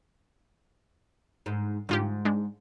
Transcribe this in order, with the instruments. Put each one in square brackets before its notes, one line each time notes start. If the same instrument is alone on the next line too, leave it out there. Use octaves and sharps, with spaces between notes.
[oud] G#2
[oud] G#2 [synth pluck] D3 F4 G4
[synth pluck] G#3 D4